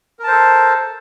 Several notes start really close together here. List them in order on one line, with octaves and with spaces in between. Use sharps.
A#4 A5 C5 A4